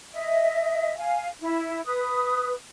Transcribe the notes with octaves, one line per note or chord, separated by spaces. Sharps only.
D#5 E5
F5 G#5
E4
B4 D#6